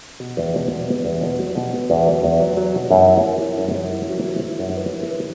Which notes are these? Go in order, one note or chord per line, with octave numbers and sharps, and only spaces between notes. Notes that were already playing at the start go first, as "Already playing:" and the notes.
B2
E2
B2
B2
B3
E2
B2
F#3
B2
B3
E2
F#3
E2
F#3
F#3
B2
F#2
E4
E4
E4
F#2
F#2
E4
F#3
E4
E4
F#2
B4
E4
B4